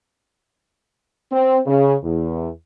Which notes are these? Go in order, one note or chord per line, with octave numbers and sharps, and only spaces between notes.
C4
C#3
E2